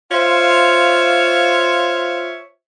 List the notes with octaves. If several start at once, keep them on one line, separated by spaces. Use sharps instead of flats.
F4 C5 C#5 E5 F5